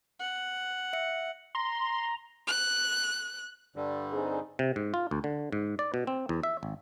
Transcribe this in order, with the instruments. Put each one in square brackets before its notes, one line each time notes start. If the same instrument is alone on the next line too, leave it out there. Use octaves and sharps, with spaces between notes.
[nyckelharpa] F#5
[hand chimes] E5 C#7
[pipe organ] A#5 [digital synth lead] C6
[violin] F#6
[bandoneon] G2 D3 G3
[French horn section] C4 D#4 G#4
[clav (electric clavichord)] C3
G#2
F4
D2
D3
G#2
D5
B2
C4
E2
E5
G#1